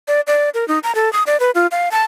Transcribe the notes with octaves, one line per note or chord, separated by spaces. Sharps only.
D5
D5
A#4
D#4
A#5
A4
D#6
D5
B4
F4
F5
A5